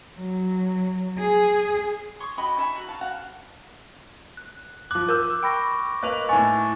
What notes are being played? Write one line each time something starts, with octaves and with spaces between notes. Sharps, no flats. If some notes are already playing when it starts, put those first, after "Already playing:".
F#3
G#4
C#5 C6 C#6 D#6
F#4 G4 D#5 B5
D#4 E5 G#5 C#6
F#4 F#5 A#5
F5 A5
F#4 F5 F#5
F#6
F3 D6 F#6
A#4 E6 G6
G5 B5 C#6 A#6 D7
A#3 B4 D#5 F#6 F7
A2 G#5 C#6 A6